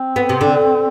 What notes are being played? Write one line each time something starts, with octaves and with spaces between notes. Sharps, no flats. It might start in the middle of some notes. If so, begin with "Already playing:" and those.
Already playing: C4
B3
C3
D3